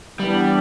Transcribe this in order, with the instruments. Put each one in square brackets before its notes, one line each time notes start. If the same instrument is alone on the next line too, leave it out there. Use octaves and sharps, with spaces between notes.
[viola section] E3 B3 D4 [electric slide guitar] G3